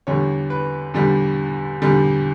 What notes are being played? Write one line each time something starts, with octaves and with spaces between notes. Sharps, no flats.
E2 D3 G3 C#5
B4
E2 D3 G3
E2 D3 G3